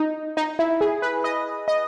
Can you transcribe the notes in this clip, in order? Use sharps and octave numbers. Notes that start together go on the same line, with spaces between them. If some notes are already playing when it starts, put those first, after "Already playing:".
Already playing: D#4 D#5
D#4
E4
G#4
B4
D#5
D#5